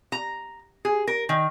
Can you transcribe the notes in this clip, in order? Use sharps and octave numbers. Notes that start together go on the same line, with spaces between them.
A#5
G#4
A#4
D#3